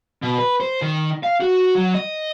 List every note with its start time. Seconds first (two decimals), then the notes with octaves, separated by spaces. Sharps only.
0.22 B2
0.38 B4
0.60 C5
0.82 D#3
1.23 F5
1.40 F#4
1.75 F#3
1.94 D#5